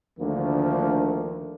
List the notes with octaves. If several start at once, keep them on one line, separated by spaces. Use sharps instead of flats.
D2 D3 D#3 F3 A3 A#3